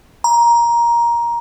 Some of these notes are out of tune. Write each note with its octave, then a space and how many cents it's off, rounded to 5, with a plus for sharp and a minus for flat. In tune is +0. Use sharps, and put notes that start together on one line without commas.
A#5 +15